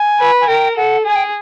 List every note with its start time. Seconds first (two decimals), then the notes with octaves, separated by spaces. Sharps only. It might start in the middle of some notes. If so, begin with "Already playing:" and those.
Already playing: G#5
0.20 B4
0.41 G#5
0.48 A#4 G5
0.77 A4 F#5
1.06 G#4 G#5
1.15 G5